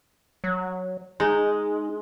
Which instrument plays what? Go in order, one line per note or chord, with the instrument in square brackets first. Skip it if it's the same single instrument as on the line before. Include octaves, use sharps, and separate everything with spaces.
[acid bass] F#3
[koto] G#3 [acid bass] D#4